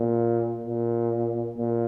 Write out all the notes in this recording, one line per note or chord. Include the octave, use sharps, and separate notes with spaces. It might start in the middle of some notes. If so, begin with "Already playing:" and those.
Already playing: A#2
A#2
A#2